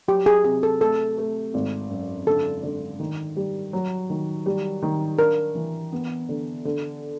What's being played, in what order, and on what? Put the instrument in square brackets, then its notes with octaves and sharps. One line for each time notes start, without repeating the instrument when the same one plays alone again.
[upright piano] F#3 [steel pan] G4
[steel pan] G#4
[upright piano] C3 [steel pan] G#4
[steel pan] A4
[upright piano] A3 [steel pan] A4
[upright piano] A3
G#1
F#2
[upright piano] D3 [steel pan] A4
[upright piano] D3
D#3
G3
F#3
D#3
G3
D#3
[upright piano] D4 [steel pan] A#4
[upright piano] E3
B3
D3
D3